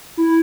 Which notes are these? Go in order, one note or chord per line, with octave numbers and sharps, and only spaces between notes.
E4